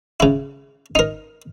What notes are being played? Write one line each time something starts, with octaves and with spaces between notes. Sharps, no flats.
C#3 E4
D#4 A#4